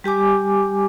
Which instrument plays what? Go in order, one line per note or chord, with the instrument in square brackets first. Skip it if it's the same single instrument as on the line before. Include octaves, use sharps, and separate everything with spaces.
[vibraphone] G3 G4 G#5 D6